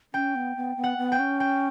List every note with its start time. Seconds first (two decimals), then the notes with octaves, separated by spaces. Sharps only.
0.14 C#4 G5
0.35 B3
0.57 B3
0.77 B3
0.84 F#5
0.98 B3
1.12 G5
1.19 C#4
1.40 G5